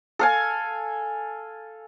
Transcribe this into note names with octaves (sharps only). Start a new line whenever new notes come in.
A4 F5 G#5